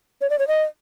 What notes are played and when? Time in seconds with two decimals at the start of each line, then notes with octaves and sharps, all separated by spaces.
0.21 C#5
0.30 D5
0.39 C#5
0.48 D#5